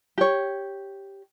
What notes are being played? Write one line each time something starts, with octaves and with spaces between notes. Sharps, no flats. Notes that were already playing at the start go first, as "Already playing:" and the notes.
G4 C#5